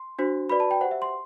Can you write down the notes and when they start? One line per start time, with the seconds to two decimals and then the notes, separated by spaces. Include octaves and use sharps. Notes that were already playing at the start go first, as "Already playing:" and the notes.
Already playing: C6
0.19 D4 F#4 C5
0.50 F#4 B4 D5 B5
0.60 A5
0.71 G5
0.81 G4 C5 F#5
0.91 E5
1.02 C6